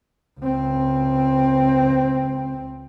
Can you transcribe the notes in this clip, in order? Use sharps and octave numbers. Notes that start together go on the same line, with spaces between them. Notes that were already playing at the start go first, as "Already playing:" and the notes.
C#2 C4